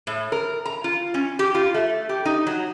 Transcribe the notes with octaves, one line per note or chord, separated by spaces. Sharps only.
A2
A#4
A#5
F4
C#4
G4
F4
A3
G4
D#4
F#3